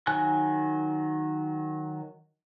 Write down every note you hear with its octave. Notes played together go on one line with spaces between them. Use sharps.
D#3 F#3 G#5 F#6